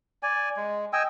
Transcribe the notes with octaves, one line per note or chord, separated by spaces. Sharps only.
D5 G#5
G#3
D#5 G5 G#5 E6